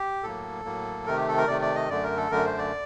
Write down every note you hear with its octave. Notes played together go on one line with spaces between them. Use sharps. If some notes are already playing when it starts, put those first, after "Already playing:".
Already playing: G4
A2 F#3 A#3 A4
A2 F#3 A#3
C3 D#3 A3 A#4
G4
A4
A#4
C3 D#3 A3 D5
D5
D#5
F#2 D3 A3 D5
A#4
A4
F#2 D3 A3 A#4
C5
D5